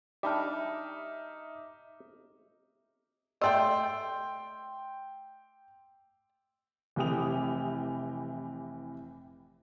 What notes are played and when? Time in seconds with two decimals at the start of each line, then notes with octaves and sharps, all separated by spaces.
0.23 G3 D4 D#4 E5 D6 F6
3.42 A3 D5 D#5 G5 C6 E6
6.96 F1 C3 E3 G4 D#6 F7